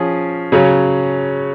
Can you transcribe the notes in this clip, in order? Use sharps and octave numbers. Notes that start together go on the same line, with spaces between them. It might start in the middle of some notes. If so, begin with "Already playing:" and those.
Already playing: F3 C#4 G#4
C#3 F#3 C#4